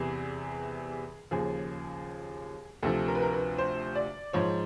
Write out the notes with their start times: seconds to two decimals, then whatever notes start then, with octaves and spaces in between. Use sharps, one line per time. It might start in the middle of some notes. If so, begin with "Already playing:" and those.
Already playing: E2 C3 E3 G#4
1.31 D#2 C#3 F3 G#4
2.83 D2 C3 F3 A4
3.08 A#4
3.15 B4
3.22 A#4
3.33 B4
3.58 C5
3.95 D5
4.33 G#2 F3 C#5